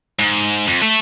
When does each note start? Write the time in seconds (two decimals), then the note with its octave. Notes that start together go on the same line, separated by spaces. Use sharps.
0.19 G#2
0.67 F2
0.82 A3